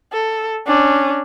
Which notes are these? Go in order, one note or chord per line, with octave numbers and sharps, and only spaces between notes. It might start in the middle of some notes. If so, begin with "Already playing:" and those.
A4
C#4 D4